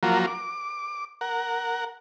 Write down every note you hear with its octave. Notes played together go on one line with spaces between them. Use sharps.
F3 F#3 A#3 F4 F#4 A#5
D6
A#4 F#5